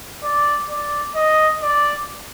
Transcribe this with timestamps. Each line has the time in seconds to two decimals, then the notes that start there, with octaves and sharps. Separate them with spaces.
0.23 D5
0.69 D5
1.15 D#5
1.62 D5